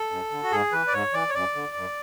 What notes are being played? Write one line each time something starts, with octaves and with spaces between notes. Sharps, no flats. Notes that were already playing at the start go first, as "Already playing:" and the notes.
Already playing: A4
F#2
D3
F#4
G#2 G#4
E3 B4
D5
G#2 C#5
E3 D5
C#5
F#2 D5
D3
F#2